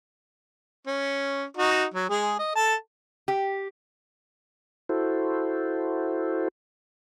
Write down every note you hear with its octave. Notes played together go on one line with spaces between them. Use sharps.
C#4
D#4 F#4
F#3
G#3 G#4
D#5
A4 A5
G4
E4 F#4 A4 C5